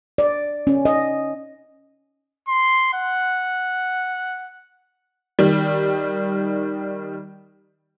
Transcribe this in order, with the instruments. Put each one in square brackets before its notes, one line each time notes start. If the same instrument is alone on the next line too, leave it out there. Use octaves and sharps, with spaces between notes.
[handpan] D5
C#4
D#5
[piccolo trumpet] C6
F#5
[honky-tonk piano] D#3 G3